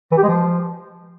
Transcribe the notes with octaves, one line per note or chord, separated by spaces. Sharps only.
E3
G4
G#3
F3